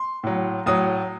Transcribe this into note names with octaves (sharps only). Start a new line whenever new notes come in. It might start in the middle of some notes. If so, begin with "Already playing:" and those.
Already playing: C6
A2 F#3
A2 F#3 D#6